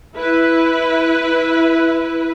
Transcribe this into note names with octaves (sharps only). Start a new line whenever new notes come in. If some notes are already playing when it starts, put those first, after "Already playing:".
E4 B4